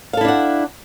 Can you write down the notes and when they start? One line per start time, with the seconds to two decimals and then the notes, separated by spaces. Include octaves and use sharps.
0.13 F5
0.17 A4
0.21 E4
0.25 D4
0.28 F#5